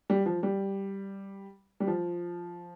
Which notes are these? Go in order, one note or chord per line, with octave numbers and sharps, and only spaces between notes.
G3
F3
G3
G3
F3